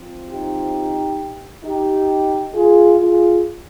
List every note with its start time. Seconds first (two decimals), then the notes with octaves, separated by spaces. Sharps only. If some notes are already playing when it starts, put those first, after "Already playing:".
Already playing: F3 C4
0.29 D#4 G4
1.64 D#4 G4
2.54 F4 G#4
3.00 F4 G#4